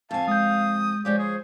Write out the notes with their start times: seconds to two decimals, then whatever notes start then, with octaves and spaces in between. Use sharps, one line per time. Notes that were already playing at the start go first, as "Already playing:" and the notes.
0.11 F2 F5 G#5 A5
0.28 G#3 D#6 G6
1.05 F3 G#3 G4 C#5 D5
1.19 G#4 C5